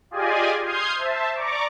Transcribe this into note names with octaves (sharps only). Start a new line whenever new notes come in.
F4 G4 G#4 D5 D#5 G#5
C6 D#6 F6 G6 G#6 C7
C5 E5 A5
D5 A#5 C#6 D6